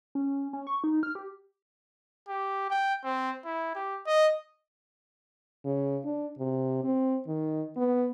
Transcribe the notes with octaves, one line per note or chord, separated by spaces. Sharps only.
C#4
C#4
C#6
D#4
F6
G4
G4
G5
C4
E4
G4
D#5
C#3
D4
C3
C4
D#3
B3